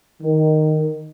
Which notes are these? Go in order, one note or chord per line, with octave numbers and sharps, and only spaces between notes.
D#3